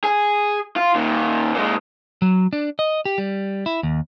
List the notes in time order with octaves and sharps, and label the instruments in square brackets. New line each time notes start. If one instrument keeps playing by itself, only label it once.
[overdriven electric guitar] G#4
F4
A#2 D#3
A#2 G#3
[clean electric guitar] F#3
D4
D#5
G4
G3
E4
D#2